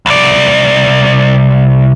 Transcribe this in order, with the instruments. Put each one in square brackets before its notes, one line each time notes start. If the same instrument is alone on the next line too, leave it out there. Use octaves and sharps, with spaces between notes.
[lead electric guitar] C2 D5